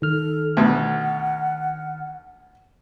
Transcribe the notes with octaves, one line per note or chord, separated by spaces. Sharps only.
D#3 A4 F6
D2 B2 F#5